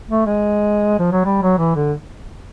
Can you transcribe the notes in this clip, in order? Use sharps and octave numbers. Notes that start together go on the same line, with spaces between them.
A3
G#3
F3
F#3
G3
F#3
E3
D3